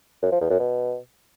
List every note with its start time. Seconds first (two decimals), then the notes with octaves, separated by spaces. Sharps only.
0.23 F#2
0.32 F3
0.41 E2
0.50 F#2
0.59 B2